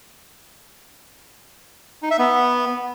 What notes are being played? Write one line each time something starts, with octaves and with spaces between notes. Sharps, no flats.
D#4
E5
B3